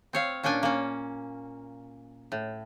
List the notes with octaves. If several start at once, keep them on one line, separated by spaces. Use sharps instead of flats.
C4 C#5 F5
A#2 C#4 D4 G5 G#5
A#3 C#4
A2